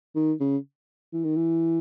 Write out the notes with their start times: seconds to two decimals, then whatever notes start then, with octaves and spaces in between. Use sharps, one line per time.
0.15 D#3
0.40 C#3
1.13 E3
1.24 D#3
1.36 E3